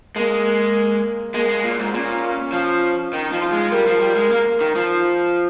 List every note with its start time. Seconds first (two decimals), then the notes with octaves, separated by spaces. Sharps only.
0.16 G#3 A#3
1.34 G#3 A#3
1.49 G#3
1.64 A#2
1.79 G#2
1.94 A#2 C#4
2.53 F3
3.13 D#3 D#4
3.32 F3
3.42 F4
3.52 G#3
3.71 G3 A#4
3.87 F3
4.01 G3
4.16 G#3
4.31 A#3
4.61 D#3
4.75 F3